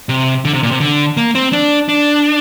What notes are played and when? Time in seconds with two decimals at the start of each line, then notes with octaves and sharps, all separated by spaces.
0.09 C3
0.45 D3
0.54 C3
0.63 A#2
0.71 C3
0.80 D3
1.17 A#3
1.35 C4
1.53 D4
1.89 D4